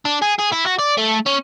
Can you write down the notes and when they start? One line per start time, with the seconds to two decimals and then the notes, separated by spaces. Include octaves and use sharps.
0.05 D4
0.22 G#4
0.39 G#4
0.53 E4
0.67 F#4
0.79 D5
0.98 A3
1.27 C#4